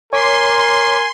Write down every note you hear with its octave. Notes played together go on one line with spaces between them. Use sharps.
A#4 C#5 G#5 C6 D6 B6